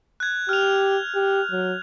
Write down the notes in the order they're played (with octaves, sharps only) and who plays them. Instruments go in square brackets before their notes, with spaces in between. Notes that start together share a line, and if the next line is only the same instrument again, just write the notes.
[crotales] F#6 G#6
[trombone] G4 [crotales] F6 F7
[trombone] G4
F#3